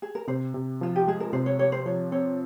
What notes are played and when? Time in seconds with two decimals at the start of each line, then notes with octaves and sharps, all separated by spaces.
0.02 G#4
0.15 A#4
0.27 C3 C5
0.54 C3
0.81 F3 F4
0.96 G4
1.07 G#3 G#4
1.20 A#4
1.33 C3 C5
1.46 C#5
1.59 G4 C#5
1.72 C5
1.86 F3 C#5
2.12 C4 C#5